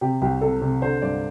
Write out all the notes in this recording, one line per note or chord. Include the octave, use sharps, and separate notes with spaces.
C3 G4
C2 G4
C3 A4
C3
D3 C5
G2 D5